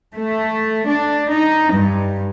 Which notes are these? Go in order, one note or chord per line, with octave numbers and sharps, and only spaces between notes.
A3
D4
D#4
G2